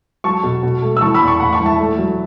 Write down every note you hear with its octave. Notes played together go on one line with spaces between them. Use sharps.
F#3 A5 C#6
B2
B2
A3
E6
E3 A5 C#6
B5 E6
E2
A5 C#6
A2 F#5 B5
A5 C#6
E3
E5 A5
A3
F#3